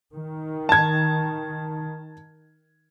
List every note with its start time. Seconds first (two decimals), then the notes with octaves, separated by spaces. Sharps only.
0.15 D#3
0.69 A5 G#6